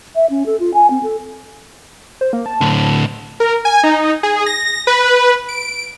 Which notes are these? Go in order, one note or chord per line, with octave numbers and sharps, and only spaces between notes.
E5
C#4
A4
F4
G#5
C4
A4
C5
A#3
A5
A2 D3
A#4
G#5
D#4
G#4
A#6
B4
D7